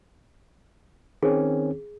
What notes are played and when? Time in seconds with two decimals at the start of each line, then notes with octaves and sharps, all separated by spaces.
1.23 D#3 C4 C#4 G#4